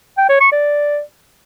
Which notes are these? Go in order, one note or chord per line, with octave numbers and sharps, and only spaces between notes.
G5
C#5
C#6
D5